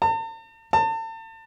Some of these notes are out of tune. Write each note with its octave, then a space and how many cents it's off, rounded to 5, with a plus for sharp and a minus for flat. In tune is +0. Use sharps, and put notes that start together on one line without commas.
A5 +45
A5 +35